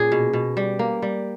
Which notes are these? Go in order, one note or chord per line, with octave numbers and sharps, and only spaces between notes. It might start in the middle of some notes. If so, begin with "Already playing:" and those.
Already playing: A#2 C#4 G#4
B2
B2
G3
A#3
G3